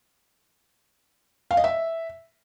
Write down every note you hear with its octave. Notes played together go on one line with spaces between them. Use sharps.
F5
D#5
E5